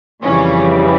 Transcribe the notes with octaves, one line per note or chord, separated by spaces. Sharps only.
F2 C#3 E3 G3 C#4